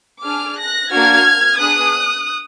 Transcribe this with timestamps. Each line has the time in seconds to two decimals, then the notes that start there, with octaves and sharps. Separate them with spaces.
0.24 D4 G#4 D6 F6
0.58 F#6 A#6
0.92 A#3 D4 F#4 F6 G#6
1.59 B3 D4 G#4 D#6 F#6